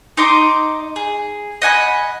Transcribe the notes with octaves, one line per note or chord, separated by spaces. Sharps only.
D#4 D#5 C6 D6
G#4
D#5 F#5 G#5 B5